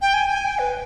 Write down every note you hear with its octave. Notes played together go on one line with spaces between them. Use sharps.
G5
G#5
G#5
G5
B4